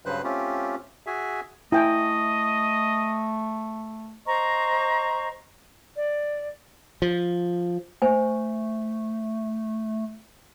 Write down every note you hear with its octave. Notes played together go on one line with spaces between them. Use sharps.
G2 C#3 F#3 B4 C5 F#6
A3 C4 C#4 F4 G4
F#4 G#4 E5 G#5
A3 E4 D#5 G5 G#5
C5 D#5 A#5 C#6
D5
F3
A3 C5 G#5